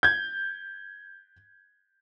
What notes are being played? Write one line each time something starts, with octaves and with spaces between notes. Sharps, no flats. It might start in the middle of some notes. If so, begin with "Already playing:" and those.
G6 G#6